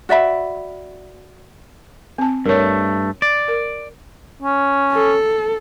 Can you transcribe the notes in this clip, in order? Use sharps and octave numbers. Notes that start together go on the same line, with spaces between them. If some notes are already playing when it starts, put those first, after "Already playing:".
F#4 D5 E5 B5
C4 A5
G2 A3 A#4 C#5
D5
A#4
C#4
A4